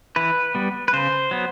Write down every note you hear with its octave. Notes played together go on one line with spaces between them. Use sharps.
E3 B4
G3 B3
B4
C#3 C5
F#3 B3